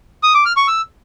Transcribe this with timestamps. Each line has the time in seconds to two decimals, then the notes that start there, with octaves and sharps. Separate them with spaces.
0.23 D#6
0.34 D6
0.46 F6
0.57 C#6
0.68 E6